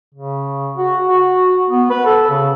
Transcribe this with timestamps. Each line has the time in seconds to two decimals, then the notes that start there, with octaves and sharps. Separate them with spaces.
0.15 C#3
0.76 F#4
1.08 F#4
1.70 B3
1.90 B4
2.06 A4
2.30 C#3